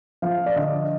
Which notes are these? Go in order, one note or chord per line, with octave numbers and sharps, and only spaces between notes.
F3 F5
D5
D3 D#5